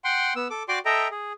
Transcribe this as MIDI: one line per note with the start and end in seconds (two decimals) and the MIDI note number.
0.04 0.33 78
0.04 0.33 79
0.04 0.33 84
0.36 0.48 59
0.36 0.48 88
0.50 0.63 69
0.50 0.63 86
0.68 0.79 66
0.68 0.79 74
0.68 0.79 79
0.68 0.79 84
0.68 0.79 86
0.85 1.08 69
0.85 1.08 75
0.85 1.08 76
0.85 1.08 79
0.85 1.08 82
1.11 1.33 68